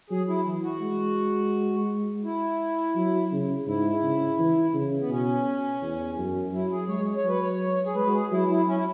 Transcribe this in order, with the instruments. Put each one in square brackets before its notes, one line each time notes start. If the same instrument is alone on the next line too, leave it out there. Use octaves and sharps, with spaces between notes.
[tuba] F#3 [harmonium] G#4
[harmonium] E4
[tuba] E3
[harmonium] F#4
[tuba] G#3
[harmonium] E4
[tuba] F#3
C#3
[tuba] G#2 [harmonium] E4
[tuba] C#3
E3
C#3
[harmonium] B3
[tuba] B2 [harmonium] C#4
[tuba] E2
F#2
[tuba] F#3 [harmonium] E4
[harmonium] G#4
[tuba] G#3 [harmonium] C#5
[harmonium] C#5
[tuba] F#3 [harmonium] B4
[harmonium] C#5
G#4
[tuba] G#3 [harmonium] B4
[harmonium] F#4
G#4
[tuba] F#3 [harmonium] E4
[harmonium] E4
C#4
E4